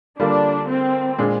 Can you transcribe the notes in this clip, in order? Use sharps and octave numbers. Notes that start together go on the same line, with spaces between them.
D3 G3 A#3 D4 F4
C4
A#2 G#3 D4